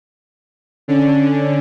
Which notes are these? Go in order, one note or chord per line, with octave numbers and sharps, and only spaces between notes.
D3 C#4 D4